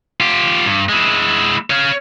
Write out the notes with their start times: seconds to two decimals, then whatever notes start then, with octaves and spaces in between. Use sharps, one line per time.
0.20 F4 G4
0.66 G2
0.89 G#3 E4
1.70 C#5 F5